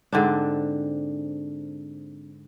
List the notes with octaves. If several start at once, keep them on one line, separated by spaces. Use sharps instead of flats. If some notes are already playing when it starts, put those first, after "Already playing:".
G#2 D3 C4 D4